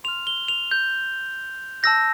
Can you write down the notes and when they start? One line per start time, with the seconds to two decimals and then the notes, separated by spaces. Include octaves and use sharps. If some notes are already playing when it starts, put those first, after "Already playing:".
0.04 C6 F7
0.08 F6
0.27 G7
0.48 F7
0.71 G6
1.83 A5 E6 G6 A#6